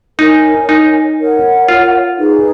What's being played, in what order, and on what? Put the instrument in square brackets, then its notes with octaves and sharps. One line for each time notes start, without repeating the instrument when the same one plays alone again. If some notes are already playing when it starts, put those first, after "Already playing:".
[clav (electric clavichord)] D#4 [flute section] A#4 C#5 G#5
[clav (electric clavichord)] D#4
[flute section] A#4 C#5 F#5
[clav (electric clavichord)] F4
[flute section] D#4 G#4 B4